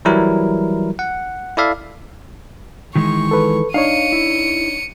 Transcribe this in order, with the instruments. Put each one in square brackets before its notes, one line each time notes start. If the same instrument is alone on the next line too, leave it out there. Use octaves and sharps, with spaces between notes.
[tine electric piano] E3 F#3 G3 E4 A#4
F#5
E4 A4 D5 E5 F5
[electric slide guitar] D#3 E3 G#3 [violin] C#6
[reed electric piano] A4 B4
[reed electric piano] D4 D#4 C#5 [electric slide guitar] F5 [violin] C#7 D#7
[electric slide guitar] E4